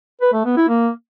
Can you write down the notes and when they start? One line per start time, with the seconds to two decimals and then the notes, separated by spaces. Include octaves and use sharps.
0.21 B4
0.33 A3
0.45 B3
0.57 E4
0.69 A#3